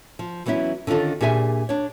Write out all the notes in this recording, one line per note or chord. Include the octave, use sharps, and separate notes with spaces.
F3
E3 F#3 B3 C#4 E4
D3 D#3 C#4 F4 A4
A#2 D4 G4 G#4 E5 G#5
D4 C#5